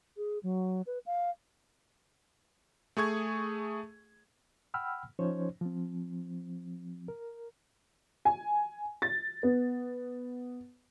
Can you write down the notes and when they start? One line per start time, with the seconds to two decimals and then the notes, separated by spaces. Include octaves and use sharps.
0.17 G#4
0.43 F#3
0.87 B4
1.06 F5
2.97 A3 G#4 C#6 G#6
4.74 F#5 G5 B5 E6 F6
5.19 F3 C#4 D#4 C5 C#5
5.61 F3 C4
7.08 A#4
8.25 G#5
9.02 A6
9.43 B3